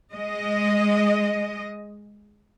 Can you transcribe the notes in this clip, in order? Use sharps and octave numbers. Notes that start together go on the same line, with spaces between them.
G#3 D#5